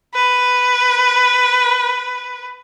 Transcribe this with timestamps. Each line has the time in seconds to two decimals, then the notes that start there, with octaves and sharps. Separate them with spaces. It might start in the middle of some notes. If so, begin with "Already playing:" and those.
0.14 B4